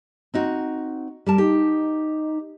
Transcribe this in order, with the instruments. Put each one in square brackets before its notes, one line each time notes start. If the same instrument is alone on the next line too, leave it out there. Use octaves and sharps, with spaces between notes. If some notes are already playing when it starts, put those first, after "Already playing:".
[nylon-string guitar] C4 D#4 F#4
G3 A#4 A5
[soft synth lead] D#4 [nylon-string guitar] G4